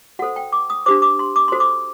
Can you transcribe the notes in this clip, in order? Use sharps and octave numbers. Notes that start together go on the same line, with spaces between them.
F#4 A4 C5 F#5
G5
D6
D#6
D4 G4 C5 D6
D6
C6
D6
F#4 A4 C5 C6
D6